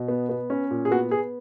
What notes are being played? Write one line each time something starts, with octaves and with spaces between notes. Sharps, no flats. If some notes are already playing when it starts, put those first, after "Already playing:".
Already playing: B2
B3
B3
C#4
A#2
G#4
B3 F#4
B3 G#4